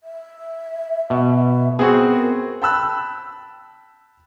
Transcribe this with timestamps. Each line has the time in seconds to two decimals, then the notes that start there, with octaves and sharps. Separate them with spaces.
0.03 E5
1.10 B2
1.79 B3 C4 F#4 G#4
2.07 A#4
2.62 G5 A5 B5 E6 F#6